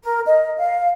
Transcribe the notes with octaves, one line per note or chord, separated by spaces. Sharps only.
A#4
D#5
F5